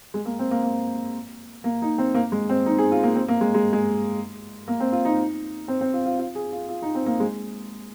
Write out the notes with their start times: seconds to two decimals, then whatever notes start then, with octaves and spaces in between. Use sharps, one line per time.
0.14 G#3
0.25 A#3
0.39 C4
0.51 A#3
0.63 A#3
1.64 A#3
1.82 D#4
1.98 C4
2.15 A#3
2.32 G#3
2.49 C4
2.66 D#4
2.78 G#4
2.91 F4
3.03 A#3
3.15 C4
3.28 A#3
3.41 G#3
3.54 G#3
3.73 G#3
4.68 A#3
4.80 C4
4.92 F4
5.05 D#4
5.68 C4
5.81 C4
5.93 F4
6.05 F4
6.19 F4
6.35 G#4
6.52 F4
6.68 F4
6.82 D#4
6.95 C4
7.06 A#3
7.20 G#3